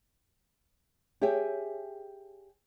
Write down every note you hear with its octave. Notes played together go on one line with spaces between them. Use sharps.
G4 G#4 C#5 E5 G5 G#5